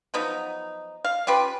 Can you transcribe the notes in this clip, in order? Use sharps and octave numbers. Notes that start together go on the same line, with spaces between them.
F3 F#3 B3 D#4
F5
C#4 F4 G4 B4